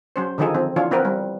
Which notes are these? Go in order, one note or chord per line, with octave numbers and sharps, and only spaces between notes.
F#3 C#4 C5
D3 D#3 F3 D#4 G#4 A4
F3 C4
E3 F3 D4 F4 C#5
B3 C4 A#4 B4
G3